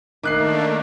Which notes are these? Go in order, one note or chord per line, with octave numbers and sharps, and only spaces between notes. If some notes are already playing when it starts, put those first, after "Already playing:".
D#3 A3 A#3 D4 D6 F#6 C7